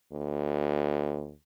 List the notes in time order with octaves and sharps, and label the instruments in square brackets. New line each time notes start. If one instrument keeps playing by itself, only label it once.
[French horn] D2